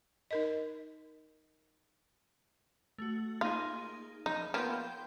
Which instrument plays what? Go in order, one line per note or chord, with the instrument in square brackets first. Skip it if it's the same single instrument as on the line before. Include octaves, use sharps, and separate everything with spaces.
[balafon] D#4 A#4 D#5
[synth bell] A3 F#4
[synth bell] A#3 D#4 G#4 [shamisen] F4
[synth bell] F3 B5 [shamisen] D#4
[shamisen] A#3 B3 F4 [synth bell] G5 C6 G6